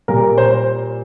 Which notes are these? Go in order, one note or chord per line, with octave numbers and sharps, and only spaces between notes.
A#2 G3 A#3 A#4
C5